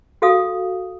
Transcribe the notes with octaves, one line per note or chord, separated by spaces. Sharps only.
F#4 G#4 A4 F5 D#6